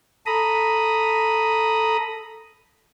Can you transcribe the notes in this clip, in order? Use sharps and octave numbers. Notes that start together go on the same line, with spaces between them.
A4 A#5 B5 D#6